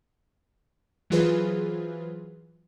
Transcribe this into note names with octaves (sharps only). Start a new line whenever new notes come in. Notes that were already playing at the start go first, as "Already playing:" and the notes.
E3 F#3 F4 G#4 B4 C5